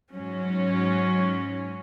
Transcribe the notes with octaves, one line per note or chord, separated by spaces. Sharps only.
G#2 F#3 C#4